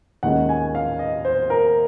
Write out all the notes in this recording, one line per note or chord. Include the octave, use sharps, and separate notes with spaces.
D#2 D#3 G#3 C#4 F#5
G#5
F5
D#5
C5
A#4